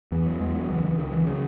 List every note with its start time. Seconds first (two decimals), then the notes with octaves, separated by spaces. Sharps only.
0.12 E2 E3
0.26 F#3
0.40 E2 G#3
0.55 F#3
0.69 C#2 E3
0.84 E3
0.98 C#2 D#3
1.12 E3
1.27 C#3 F#3